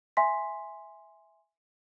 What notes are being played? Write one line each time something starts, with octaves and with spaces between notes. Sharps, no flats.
E5 G#5 C6 B6